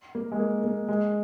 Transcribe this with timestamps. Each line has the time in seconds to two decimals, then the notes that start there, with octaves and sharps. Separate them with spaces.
0.15 A#3
0.32 G#3
0.39 A#3
0.64 A#3
0.88 G#3